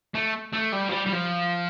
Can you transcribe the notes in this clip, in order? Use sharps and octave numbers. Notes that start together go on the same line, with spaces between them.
A3
A3
G3
F3
G3
G3
F3